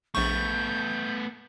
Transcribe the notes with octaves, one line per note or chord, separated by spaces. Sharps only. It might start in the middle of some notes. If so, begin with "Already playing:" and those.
A#1 A3 B3 C#6 G6